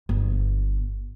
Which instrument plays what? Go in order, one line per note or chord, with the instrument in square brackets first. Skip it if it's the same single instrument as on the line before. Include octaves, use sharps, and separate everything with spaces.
[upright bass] G1